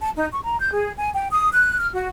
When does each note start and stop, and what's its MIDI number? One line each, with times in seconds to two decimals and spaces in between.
0.02 0.11 81
0.16 0.27 63
0.32 0.41 85
0.45 0.57 82
0.59 0.73 91
0.74 0.92 68
0.97 1.10 80
1.15 1.27 79
1.30 1.49 87
1.52 1.77 90
1.78 1.89 89
1.94 2.09 66